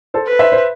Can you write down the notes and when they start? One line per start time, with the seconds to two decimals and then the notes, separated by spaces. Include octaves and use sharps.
0.14 A4 C5
0.27 B4
0.39 C5 E5
0.52 C5